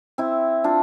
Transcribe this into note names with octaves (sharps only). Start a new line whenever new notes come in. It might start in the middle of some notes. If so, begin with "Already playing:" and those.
C4 E4
D4 F4